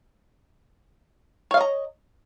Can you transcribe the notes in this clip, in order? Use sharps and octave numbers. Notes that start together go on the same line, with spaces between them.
C#5 D#5 F5 A#5